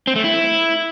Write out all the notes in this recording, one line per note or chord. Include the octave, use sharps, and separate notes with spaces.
C4
A3
E4